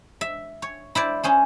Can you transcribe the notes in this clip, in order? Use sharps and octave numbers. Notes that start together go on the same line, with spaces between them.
E5
C#5
E4 C5 D5
C#4 G#4 C5